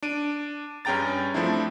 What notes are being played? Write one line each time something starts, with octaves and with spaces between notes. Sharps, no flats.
D4 D7 D#7
G2 C#4 G#4 G5 A#5 A6
F3 A3 C4 D4 E4